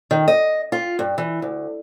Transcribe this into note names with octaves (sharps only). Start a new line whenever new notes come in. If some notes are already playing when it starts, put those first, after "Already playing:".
D#3
D#5
F4
G2
E3
D2